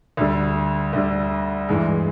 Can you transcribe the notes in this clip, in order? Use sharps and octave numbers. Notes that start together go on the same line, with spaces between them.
D2 D3 G3
D2 D3 G3
G2 E3 G#3